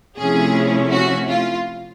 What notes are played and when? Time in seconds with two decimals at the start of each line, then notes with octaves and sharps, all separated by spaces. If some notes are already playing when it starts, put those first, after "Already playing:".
0.17 C3 F3 A3 C#4 E4 G#4
0.91 F#4
1.28 F4